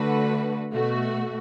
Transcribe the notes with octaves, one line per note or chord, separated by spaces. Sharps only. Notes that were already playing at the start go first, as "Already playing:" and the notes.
Already playing: D3 A3 F#4 B4
B2 A3 F#4